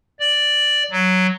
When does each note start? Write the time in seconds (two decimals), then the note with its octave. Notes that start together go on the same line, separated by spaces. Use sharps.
0.20 D5
0.91 F#3